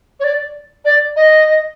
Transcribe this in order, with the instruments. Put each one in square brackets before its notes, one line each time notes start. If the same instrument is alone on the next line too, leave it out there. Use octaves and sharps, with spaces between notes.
[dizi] C#5
D5
D5
D#5